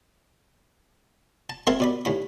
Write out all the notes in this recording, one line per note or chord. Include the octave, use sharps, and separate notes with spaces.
A5
G#3 A#3 C4 A#4 E5 A5
B2 D5 B5
D#2 A2 B5